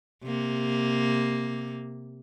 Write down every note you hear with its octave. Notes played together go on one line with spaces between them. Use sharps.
C3 A#3